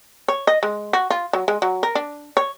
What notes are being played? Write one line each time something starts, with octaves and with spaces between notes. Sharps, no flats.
C#5
D#5
G#3
F#4
F4
F#3
G#3
F#3
A#4
D4
C#5